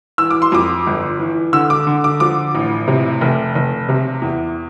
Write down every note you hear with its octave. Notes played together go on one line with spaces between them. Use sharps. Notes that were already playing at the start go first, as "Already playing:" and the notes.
E3 E6
D6
C6
F2 D6
G1
E3
D3 E6
D6
D3
D6
F3 D6
A1
C3
F1
F1
C3
E2